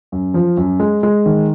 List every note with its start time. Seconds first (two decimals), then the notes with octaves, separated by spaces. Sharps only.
0.12 F#2
0.34 F3
0.57 F#2
0.80 G#3
1.03 G#3
1.26 D#3